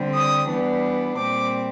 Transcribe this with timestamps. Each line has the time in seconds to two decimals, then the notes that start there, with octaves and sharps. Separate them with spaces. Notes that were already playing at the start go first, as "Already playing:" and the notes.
Already playing: D3 G3 C4
0.14 D#6
0.48 E3 G3 B3 D4
1.17 A#2 G3 C4 D6